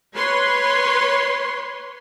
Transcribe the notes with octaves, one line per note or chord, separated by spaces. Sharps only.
B4 C#5 C6